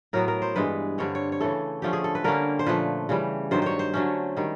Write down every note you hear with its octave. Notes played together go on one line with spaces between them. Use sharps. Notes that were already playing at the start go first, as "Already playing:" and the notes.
A2 F#3 B3 A#4
A#4
C5
G2 E3 G#3 B4
G2 D3 G3 C4 C#5
C#5
C#5
C#3 E3 A3 A4
D3 F3 A3 C#4 G4
G#4
A4
B4
D3 G3 A#3 C#4 A#4
C5
A#2 F3 A3 B4
C#3 E3 G3
G2 D#3 F#3 C5
C5 C#5
C5
D3 F#3 A3 C#4
D#3 G3